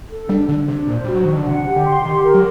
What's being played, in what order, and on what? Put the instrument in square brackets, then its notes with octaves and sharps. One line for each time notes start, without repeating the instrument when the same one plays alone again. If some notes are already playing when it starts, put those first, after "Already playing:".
[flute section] A4
[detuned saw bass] G3 [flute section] D4
[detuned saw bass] D3 [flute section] D4
[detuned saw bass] C3 [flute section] D4
[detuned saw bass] A#2 [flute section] C5
[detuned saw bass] G3 [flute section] F#4
[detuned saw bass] F#3
[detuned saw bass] D#3 [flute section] D4
[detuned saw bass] D3
[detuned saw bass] C3 [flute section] F#5
[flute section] G4
[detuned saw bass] D3
[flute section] C6
[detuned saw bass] D#3 [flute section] G4
[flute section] A#4
[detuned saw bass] F#3